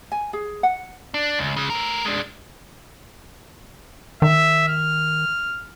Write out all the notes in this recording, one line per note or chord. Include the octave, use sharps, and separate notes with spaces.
G#5
G#4
F#5
D4
C#2
C#3 G#3
A3 A#4
G#3 D4
D#3 E5
F6